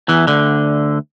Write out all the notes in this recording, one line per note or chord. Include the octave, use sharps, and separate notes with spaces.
E2 E3
D2 D3